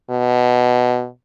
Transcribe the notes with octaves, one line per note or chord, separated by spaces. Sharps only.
B2